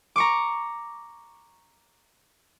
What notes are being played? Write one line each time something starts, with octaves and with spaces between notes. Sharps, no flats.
A#5 C#6 D6